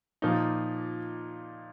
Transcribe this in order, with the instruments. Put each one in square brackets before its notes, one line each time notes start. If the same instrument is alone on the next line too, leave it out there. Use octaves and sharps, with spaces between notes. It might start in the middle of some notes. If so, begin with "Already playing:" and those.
[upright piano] A#2 F3 A#3 D#4